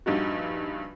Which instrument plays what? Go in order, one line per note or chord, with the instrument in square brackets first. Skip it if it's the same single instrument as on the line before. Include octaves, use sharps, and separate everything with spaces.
[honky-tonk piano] A#1 G2 D#4 F#4